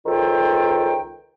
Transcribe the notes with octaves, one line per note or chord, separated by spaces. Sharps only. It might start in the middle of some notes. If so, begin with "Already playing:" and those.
C#2 D#3 F4 A4 C5 G5